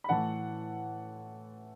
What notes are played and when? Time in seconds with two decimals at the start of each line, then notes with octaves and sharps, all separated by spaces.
0.04 B5
0.09 A2 E3 A3 F#5 A5